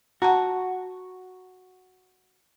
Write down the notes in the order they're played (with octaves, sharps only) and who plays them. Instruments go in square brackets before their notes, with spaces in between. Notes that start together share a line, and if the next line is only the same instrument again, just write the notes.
[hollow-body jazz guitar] F#4 [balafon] F#5 A5 A#5